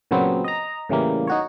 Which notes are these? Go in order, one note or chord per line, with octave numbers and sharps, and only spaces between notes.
A#2 C#3 F#3 B3 C4
D#5 A#5
A2 C#3 E3 G3 A#3
D#4 F#4 C#5